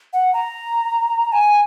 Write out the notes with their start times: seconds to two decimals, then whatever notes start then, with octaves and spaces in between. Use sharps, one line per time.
0.13 F#5
0.33 A#5
1.32 G#5